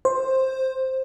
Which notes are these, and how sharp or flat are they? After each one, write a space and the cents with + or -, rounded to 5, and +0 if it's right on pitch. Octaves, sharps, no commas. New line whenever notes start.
C5 +10